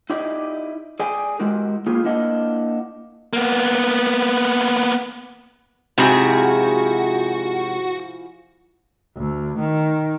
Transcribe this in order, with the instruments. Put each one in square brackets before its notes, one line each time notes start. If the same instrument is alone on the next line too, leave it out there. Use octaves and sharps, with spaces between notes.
[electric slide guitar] D#4 E4 G4 D5 D#5
G#4 D5 G5 G#5
G#3 E4 F#4 G4 A#4
A#3 E4 F4 G4 G#4
A#3 D4 E4 A#4 D#5 F#5
[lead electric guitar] A#3 B3
[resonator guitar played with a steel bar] G#2 C3 [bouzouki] F3 E4 G#4 [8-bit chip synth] F#4
[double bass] D2
D#3